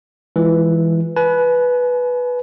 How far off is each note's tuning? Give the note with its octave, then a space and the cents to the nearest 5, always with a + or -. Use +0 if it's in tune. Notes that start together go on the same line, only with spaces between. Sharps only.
E3 +0 G#3 -15 F4 -20
B4 -5 G#5 +40